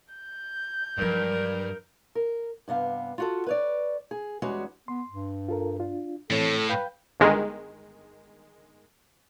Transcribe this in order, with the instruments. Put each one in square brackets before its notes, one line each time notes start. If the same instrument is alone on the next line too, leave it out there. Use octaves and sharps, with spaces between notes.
[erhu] G6
[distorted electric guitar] G2 [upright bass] F3 F#3 [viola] A#4
[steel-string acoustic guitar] A#4
G2 C3 B3 F5
F4 F#4 A4
B4 C#5 D5
G#4
E2 G3 G#3 C#4 F#4
[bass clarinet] B3 [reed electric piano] C6
[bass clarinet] G2
[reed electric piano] F4 A4 A#4
D4 F4
[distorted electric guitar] A2 [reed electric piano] E3 C4 C#5 [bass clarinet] A4
[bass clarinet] B4 [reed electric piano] F5 G5 G6
[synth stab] G1 D#3 G#3